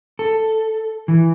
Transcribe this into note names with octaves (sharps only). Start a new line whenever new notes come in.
A4
E3